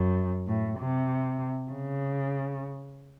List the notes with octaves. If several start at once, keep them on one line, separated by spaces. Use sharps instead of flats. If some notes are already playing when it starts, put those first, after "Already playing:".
Already playing: F#2
A2
C3
C#3